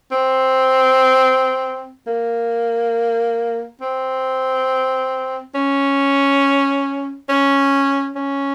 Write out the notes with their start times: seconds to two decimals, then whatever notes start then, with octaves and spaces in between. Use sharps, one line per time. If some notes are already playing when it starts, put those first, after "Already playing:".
0.12 C4
2.07 A#3
3.81 C4
5.55 C#4
7.29 C#4
8.16 C#4